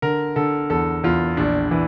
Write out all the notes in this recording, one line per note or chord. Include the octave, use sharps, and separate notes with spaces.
D3 A#4
D3 A4
E2 A4
E2 F4
A#1 D4
E3